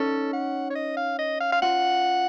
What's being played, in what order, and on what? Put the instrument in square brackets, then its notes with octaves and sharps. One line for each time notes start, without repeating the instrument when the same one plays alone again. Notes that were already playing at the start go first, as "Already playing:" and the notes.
Already playing: [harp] C#4 D#4 [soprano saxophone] A4
[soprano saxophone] F#5
C#5
D#5
F5
D#5
F5
F5
[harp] F4 [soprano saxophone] F#5